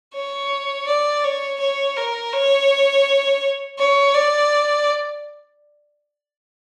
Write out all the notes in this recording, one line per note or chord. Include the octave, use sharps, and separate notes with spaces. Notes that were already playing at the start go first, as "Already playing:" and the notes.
C#5
D5
C#5
C#5
A#4
C#5
C#5
D5